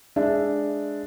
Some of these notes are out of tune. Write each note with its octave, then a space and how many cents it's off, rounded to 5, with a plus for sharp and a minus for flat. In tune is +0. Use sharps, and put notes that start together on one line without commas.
G#3 +0 D4 +0 E5 +0